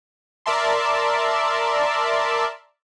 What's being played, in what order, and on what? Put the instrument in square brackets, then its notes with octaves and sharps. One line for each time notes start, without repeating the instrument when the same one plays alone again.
[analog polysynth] A#4 D5 E5 A5 C6